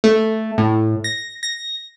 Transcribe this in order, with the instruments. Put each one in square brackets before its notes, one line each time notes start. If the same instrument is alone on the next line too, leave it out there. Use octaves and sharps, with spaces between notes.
[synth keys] A3
A2
A#6
A#6